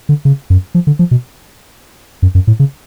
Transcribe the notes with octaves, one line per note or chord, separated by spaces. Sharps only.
D3
C#3
F#2
F3
D3
F3
B2
F#2
F#2
A2
C#3